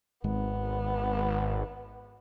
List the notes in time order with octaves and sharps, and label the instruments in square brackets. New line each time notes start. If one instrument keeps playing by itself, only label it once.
[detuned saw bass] G#1 [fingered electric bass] G#2 G#3 [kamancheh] B3